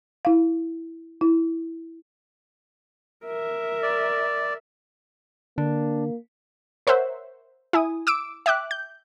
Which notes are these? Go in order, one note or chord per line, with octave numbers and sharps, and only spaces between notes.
E4 F5
E4
A#4 E5
D5
D3 A#3 D4
A#4 C5 C#5 E5 F#5
E4 G#5 D#6
D6 E6 D7
E5 G5 D6 F#6
G6